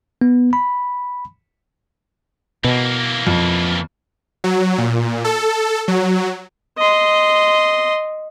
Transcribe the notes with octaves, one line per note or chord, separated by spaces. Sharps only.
B3
B5
B2 E3 A#3
F2
F#3
A#2
A4
F#3
D#5 C6